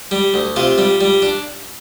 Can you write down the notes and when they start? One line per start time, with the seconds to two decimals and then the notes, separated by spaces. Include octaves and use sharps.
0.11 G3
0.34 D2
0.56 C3 F4
0.78 G3
1.01 G3
1.22 D4